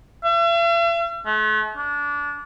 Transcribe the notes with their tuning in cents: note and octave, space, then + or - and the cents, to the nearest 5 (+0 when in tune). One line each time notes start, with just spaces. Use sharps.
E5 +45
A3 -40
D4 -20